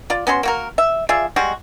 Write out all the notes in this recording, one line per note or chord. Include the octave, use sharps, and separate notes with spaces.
F4 D5
B3 C#4 F#4 C6
A#3 F#4 A#4
E5
F4 G#4 D5 E5
G3 G#3 F#4